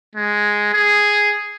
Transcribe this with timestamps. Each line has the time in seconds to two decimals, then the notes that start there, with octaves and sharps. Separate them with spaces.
0.15 G#3
0.73 G#4